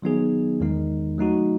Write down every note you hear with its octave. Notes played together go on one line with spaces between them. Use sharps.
D#3 F#3 B3 D#4 G#4
E2 D#3 G#3 D#4
F#3 A3 D#4 F#4